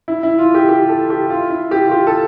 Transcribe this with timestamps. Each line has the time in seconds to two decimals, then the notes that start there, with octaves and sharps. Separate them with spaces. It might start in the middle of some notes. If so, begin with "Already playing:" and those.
0.08 E4
0.23 E4
0.39 F4
0.54 G4
0.69 G4
0.89 A4
1.10 G4
1.30 F4
1.50 E4
1.71 G4
1.87 F4
1.91 G4
2.07 A4